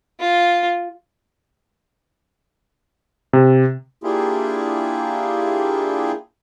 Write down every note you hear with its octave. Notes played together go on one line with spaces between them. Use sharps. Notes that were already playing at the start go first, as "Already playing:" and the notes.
F4
C3
A#3 D4 E4 F4 G4 G#4